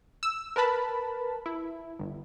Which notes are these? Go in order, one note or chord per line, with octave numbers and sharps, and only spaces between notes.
E6
A#4 B4 A5 B5
E4
G1